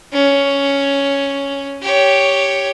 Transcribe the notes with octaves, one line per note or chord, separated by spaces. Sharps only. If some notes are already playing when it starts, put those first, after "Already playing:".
C#4
G4 C#5